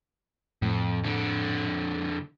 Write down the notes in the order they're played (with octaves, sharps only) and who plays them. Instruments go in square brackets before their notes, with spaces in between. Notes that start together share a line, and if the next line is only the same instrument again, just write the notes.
[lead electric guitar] F2 [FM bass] A2
[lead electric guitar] F2 D3